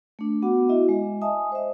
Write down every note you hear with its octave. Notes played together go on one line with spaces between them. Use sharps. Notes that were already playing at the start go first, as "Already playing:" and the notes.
A3 D4
B3 F#4 F#5 D6
E4 F#4 D#5 E5
G#3
D#5 E5 G#5 A5 D#6
C5 E5